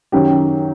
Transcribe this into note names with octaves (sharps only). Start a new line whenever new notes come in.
F#2 D#3 F#3 G4